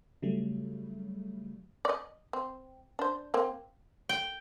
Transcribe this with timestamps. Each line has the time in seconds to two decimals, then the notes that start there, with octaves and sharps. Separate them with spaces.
0.22 C#3 F#3 G3 A3
1.85 D5 D#5
2.33 C4
2.99 D4 C5
3.34 A#3 C4
4.09 G5